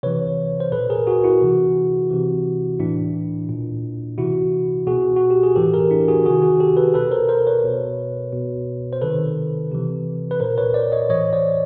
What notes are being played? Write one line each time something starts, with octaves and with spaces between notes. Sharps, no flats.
C3 E3 B4 C#5
C5
A#2 A4 B4
G#4 A#4
F#4 G#4
E4 F#4
C3 E3
C3 E3
A2 E3 D4 E4
A#2
C3 E3 E4 F#4
B2 F#4 G#4
F#4
G4
G#4
A2 E3 G4 A4
G#4 A#4
D4 E4
F#4 G#4
C3 D#3 F#4 G#4
F#4 G#4
G4 A4
A4 B4
B2 A4 B4
A#4 C5
A#4 C5
B4 C#5
B2
B2
C5
C3 D#3 A4 B4
C3 E3
B4
A#2 A#4 C5
B4 C#5
C5 D5
C#5 D#5
A2 E3 C#5 D#5
C5 D5